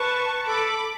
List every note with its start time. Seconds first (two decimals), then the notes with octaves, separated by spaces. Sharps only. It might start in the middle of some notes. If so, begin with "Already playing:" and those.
Already playing: B4 A5 C#6
0.47 A4 B5 D6